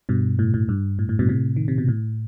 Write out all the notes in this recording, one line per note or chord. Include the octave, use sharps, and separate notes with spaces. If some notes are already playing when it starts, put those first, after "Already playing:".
G2 B2
A2
A2
G2
A2
A2
G2 B2
A2 C3
D#3
C3
B2
A2